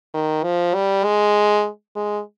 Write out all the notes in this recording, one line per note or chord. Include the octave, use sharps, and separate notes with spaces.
D#3
F3
G3
G#3
G#3